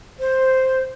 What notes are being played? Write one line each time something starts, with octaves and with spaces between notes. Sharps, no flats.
C5